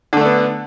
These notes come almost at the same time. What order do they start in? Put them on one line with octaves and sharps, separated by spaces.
D3 A3 D4 B3